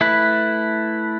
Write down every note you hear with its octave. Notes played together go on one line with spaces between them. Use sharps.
A3 E4 B4